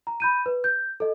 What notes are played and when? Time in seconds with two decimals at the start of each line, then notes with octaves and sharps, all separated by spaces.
0.07 A#5
0.20 B5 G6 D#7
0.46 B4
0.64 G6
1.00 A4 D#5